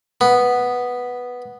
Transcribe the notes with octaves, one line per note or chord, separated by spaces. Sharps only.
B3